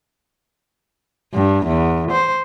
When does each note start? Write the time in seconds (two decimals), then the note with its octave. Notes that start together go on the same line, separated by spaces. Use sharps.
1.34 G2
1.66 E2
2.11 C5